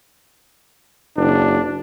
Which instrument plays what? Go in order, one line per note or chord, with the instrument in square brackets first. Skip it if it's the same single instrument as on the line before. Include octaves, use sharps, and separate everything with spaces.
[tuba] F#1 [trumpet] D4